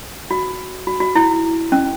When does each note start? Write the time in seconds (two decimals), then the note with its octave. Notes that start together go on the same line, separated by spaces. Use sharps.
0.31 F#4
0.87 F#4
1.00 F#4
1.15 E4
1.72 C#4